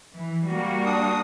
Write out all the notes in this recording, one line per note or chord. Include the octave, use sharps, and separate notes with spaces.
E3
G3 A#3 F#4
D4 D#6